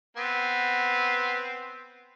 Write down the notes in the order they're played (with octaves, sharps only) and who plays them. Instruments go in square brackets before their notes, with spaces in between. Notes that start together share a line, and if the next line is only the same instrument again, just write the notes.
[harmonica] B3 C4